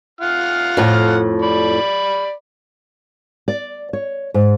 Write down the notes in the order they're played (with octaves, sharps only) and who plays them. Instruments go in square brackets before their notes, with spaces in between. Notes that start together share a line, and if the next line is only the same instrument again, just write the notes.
[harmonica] F4 F#5 F6
[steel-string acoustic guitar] F2 A2
[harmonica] D5 B5
[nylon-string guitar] D5
C#5
G#2